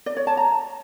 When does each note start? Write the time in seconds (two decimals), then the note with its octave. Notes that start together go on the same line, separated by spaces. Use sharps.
0.06 D5
0.17 C#5
0.27 A5
0.37 A#5